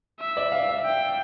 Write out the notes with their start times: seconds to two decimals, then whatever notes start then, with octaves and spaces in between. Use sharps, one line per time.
0.20 E5
0.37 D5
0.52 F5
0.69 E5
0.85 G5